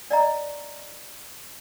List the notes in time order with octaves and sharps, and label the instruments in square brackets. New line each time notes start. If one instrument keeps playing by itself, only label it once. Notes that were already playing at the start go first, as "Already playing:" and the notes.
[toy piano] D5 D#5 A#5